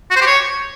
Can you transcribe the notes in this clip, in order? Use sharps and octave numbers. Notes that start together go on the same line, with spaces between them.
F#4
C5
G4
C#5